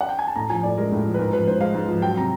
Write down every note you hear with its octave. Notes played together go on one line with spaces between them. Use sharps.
F#5
G5
G#5
A5
A2 A#5
F3 G#5
A2 D5
G#3 A#4
A2
F3
B4
G#2 A#4
F3 B4
G#2 C5
G#3 F5
G#2
F3
F#3 G5
C3 A#5